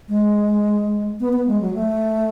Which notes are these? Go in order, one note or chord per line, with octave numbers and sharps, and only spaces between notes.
G#3
B3
B3
G#3
F#3
A3